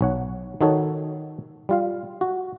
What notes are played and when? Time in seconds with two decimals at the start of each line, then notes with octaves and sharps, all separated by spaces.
0.01 B1 C#5 F#5
0.61 D#3 D#4 F#4 A4 C#5
1.69 G3 F4 F5
2.21 F#4